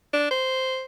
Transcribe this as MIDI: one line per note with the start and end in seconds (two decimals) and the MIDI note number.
0.13 0.31 62
0.31 0.85 72